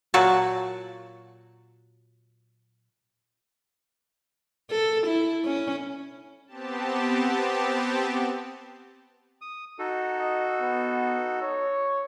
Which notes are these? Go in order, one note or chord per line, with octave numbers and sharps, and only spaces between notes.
A#2 F#3 F#4 A5
A4
E4
C#4
B3 C4 G4 A5
D#6
D#4 F#4 A4
D#5
B3
C#5